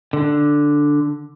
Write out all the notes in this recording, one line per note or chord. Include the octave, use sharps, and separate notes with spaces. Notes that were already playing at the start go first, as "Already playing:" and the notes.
D3